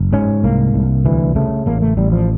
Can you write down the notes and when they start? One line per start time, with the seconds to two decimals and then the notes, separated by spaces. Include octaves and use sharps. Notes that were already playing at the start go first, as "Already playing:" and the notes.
Already playing: F#1
0.13 G#2 C#4
0.44 C2 A#3
0.74 C2
1.05 D2 E3
1.36 C#3 A3
1.66 A1 A#3
1.82 A3
1.97 A1 G3
2.12 F3